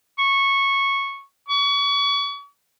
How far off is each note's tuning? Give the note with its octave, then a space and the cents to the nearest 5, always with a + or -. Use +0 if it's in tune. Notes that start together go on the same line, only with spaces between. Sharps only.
C#6 -10
C#6 +35